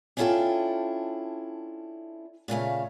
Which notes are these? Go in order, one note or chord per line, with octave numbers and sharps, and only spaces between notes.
C#4 D4 E4 F4 A4 G5
A#2 C#3 A3 F5